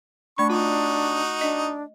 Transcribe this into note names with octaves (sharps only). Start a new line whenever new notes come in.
A3 D4 D5 B5 C#6
D#4 F4 F#4
D4 D#5